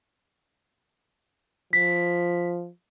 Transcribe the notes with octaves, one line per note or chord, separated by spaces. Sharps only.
F3 B6